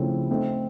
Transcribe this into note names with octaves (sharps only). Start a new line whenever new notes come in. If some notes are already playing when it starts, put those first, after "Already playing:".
Already playing: C#3 F3 A3 C4 E4
A3 C4 D#4